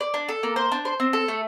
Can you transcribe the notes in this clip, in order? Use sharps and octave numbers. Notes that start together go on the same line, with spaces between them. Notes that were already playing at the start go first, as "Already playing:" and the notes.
D5
D4
A4
A#3
C5
D4
C5
C4
A4
A3